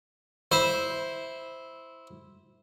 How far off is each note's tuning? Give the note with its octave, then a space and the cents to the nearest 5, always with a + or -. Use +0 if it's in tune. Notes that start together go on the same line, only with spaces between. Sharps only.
E4 -10 C5 +0